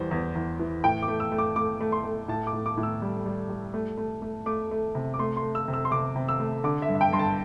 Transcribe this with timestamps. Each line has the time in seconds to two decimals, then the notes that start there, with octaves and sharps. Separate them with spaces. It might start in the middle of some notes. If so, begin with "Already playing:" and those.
Already playing: E2 E3 G3 C5
0.11 E2
0.35 E2
0.59 E3
0.84 A2 G5
1.02 D6
1.08 A3
1.20 E6
1.32 A3
1.38 D6
1.56 A3 D6
1.81 A3
1.92 C6
2.04 A3
2.28 A2 A5
2.47 D6
2.53 A2
2.66 D6
2.77 A2
2.83 E6
3.02 G3
3.26 G3
3.49 G3
3.74 A3
3.98 A3
4.22 A3
4.46 A3 D6
4.71 A3
4.95 C3
5.14 D6
5.19 A3 C6
5.37 C6
5.43 A3
5.55 E6
5.68 C3
5.74 E6
5.85 C6
5.91 C3 D6
6.16 C3
6.29 E6
6.40 A3
6.64 D3 D6
6.82 E5
6.89 G2
6.95 E5
7.01 G5
7.13 G2 C6
7.19 A5